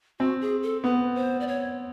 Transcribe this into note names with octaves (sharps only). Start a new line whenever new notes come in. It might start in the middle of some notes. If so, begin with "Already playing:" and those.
C4 F#4
G#4
A4
B3 B4
C5
D5
C#5